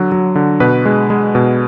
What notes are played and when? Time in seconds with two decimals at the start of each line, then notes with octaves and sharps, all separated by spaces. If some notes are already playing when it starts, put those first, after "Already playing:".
Already playing: D3 F#3
0.12 F#3
0.35 D3
0.60 B2 B4
0.85 G#3
1.10 G#3
1.35 B2